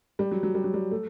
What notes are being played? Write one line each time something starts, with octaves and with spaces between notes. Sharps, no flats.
G3
F#3
F#3
G3
F#3
G3
A3